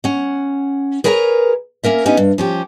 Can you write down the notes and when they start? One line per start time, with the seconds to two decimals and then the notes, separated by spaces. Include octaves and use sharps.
0.04 C#4 F#5
1.04 G#4 A#4 B4 C#5 G5 A#5
1.84 A#3 C#4 A#4 E5
2.06 B3 C#4 D#4 G4 G#5
2.17 G2
2.38 F3 C#4 G4